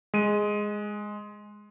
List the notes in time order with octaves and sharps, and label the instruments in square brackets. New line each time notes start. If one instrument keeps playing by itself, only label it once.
[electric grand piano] G#3 D#7